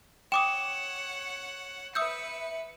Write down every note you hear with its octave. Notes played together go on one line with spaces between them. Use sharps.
C#5 F#5 G5 D6 D#6 E7
B4 E5 D#6 E6 G6 C#7